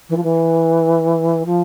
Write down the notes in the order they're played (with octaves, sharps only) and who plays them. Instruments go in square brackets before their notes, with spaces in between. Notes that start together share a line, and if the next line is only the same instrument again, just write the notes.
[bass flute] E3
F3
E3
F3